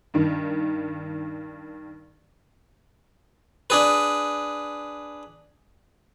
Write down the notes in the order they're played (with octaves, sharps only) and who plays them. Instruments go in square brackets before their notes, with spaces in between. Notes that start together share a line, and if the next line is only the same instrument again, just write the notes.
[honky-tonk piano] G2 D#3
[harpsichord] D4 G#4 B4